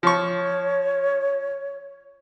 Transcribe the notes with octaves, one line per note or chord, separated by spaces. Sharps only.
F3 C#5 C#6